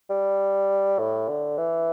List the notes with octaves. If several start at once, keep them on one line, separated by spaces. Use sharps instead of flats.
G3
A2
D3
E3